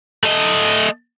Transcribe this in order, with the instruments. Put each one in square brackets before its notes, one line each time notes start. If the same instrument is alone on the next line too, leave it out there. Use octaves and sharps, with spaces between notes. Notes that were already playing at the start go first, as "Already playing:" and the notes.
[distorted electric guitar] A3 D#5